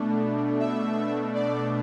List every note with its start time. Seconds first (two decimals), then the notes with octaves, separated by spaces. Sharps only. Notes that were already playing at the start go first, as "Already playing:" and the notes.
Already playing: B2 A3 D4
0.60 E5
1.35 D5